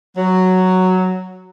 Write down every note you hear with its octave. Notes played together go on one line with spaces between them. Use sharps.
F#3